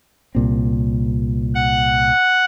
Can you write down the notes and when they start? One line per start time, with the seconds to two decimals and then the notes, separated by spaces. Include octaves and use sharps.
0.35 C2 A#2 C4
1.55 F#5